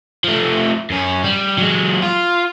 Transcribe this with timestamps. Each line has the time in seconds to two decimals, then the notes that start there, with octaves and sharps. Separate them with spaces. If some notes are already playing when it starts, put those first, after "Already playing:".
0.24 F3 A3
0.90 F#2 C#4
1.24 G3
1.58 F#3 G#3
2.03 F4